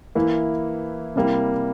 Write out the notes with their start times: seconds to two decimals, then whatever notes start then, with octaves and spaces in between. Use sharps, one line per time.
0.15 E3 A#3 E4
1.16 C3 G3 A#3 E4